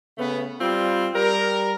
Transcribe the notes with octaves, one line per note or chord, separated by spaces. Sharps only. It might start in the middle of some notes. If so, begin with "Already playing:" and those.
C#3 A3 B3
G3 C4 F4
G3 A#4